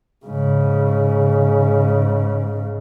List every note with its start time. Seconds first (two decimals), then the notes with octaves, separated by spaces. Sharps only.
0.26 G#2 C#3